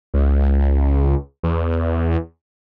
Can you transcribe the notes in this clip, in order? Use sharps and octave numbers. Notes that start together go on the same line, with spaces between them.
C#2
E2